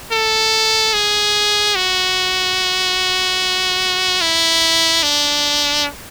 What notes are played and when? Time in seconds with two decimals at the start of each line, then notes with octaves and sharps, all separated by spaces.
0.12 A4
0.94 G#4
1.76 F#4
4.21 E4
5.03 D4